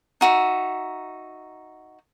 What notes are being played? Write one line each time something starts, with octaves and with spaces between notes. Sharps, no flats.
D#4 F#4 E5